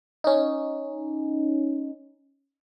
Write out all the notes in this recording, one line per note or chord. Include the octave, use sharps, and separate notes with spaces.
C#4 D#4